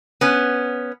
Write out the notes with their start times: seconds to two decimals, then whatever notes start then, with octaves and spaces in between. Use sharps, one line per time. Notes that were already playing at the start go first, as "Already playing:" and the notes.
0.21 B3 C#4